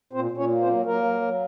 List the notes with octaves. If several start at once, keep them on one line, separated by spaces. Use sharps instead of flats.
A#2 C4 C5
A#2
C#4 C#5
A#3
C4 C5
F#3
F#3 A#3 A#4
F#3
F#3